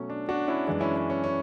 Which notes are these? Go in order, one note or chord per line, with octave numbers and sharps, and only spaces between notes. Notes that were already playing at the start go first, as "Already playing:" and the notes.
Already playing: B2 F#3 A3 C#4
D4
D4 F#4
C#4 E4
F#2 E3 G#3 D4
C#4 E4
C#4
C#4
C#4